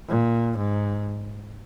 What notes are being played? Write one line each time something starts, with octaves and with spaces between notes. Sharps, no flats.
A#2
G#2